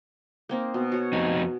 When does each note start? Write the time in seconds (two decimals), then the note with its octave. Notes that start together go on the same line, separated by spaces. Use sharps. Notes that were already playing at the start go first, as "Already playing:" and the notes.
0.49 A#3 C4 D#4
0.74 B2
0.92 F#4 C#5
1.13 F2 D#4 G#5